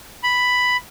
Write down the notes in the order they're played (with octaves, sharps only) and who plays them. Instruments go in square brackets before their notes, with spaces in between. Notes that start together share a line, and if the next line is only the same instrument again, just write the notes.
[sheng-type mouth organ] B5